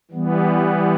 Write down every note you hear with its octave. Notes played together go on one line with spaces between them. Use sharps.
E3 G3 B3